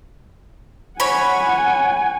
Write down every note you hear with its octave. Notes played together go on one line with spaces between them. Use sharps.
C#5 F#5 G#5 B5